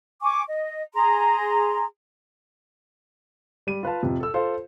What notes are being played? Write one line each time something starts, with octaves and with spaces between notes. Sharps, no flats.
G#5 C#6 D6
D#5
G#4 A#5 C6
G3 D#7
F4 B4 F5 A5
F2 C3 F3
A4 E6
F4 A4 C5 F5 C6